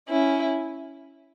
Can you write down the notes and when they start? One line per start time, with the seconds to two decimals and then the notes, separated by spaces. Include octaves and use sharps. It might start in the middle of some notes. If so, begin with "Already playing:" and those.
0.09 C#4 E4